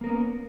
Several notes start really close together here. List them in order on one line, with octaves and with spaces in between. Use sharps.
A#3 A#4 B3 C#4